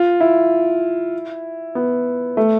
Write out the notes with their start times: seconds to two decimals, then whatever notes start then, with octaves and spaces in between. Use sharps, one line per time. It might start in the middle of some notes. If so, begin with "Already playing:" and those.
Already playing: F4
0.20 E4
1.75 B3
2.37 A3